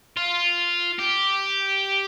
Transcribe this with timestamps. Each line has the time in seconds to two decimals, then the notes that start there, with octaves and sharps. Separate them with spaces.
0.17 F4
0.99 G4